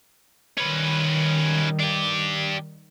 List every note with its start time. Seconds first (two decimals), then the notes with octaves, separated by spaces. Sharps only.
0.58 D#3 G3 C#4 B4
1.80 D4 G4